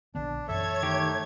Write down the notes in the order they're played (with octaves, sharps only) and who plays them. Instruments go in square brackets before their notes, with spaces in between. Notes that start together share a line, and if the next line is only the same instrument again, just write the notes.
[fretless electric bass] A#1 D3 B3 [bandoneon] D4
[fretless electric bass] F#2 E3 [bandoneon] A4 E5 [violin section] C#5 G#6
[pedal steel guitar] D#3 G4 [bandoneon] A3